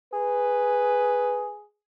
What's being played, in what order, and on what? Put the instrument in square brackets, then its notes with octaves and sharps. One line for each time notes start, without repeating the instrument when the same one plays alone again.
[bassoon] G#4 [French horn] B4